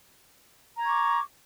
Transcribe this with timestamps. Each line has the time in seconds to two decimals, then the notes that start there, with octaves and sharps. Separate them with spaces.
0.76 A#5
0.81 G#6
0.85 C#6
0.89 D6